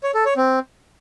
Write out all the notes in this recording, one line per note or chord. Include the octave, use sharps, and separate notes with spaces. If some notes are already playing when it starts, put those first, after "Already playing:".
C#5
A4
C#5
C4